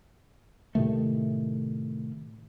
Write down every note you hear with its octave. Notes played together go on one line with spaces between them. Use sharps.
A2 C3 D#3 A3